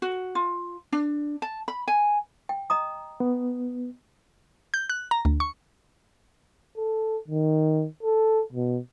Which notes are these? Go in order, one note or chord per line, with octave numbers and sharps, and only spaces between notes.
F#4
F4
D4
A5
B5
G#5
G5
D#5 A#5 D#6
B3
G6
F#6
A#5
D2
C#6
A4
D#3
A4
B2